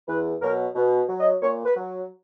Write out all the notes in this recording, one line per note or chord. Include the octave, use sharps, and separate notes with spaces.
E2 B4
B2 F#3 A#4
B2
F#3
D#5
A#2 C#5
B4
F#3